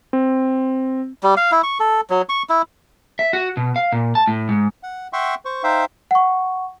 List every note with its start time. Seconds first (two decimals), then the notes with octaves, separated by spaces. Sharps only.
0.13 C4
1.23 G3
1.37 F5
1.52 E4
1.63 C#6
1.80 A4
2.10 F#3
2.29 C#6
2.49 E4
3.19 E5
3.33 F#4
3.57 B2
3.76 F5
3.92 A#2
4.15 A5
4.27 A2
4.49 G#2
4.83 F#5
5.13 E5 F#5 G5 C6 C#6
5.45 C5 C#6
5.63 D#4 C5 E5 F5 G5
6.11 F#5 C#6